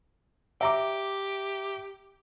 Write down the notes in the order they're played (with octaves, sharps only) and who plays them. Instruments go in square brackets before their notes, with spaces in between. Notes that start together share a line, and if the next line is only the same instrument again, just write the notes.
[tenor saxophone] G4 [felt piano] E5 A#5 D6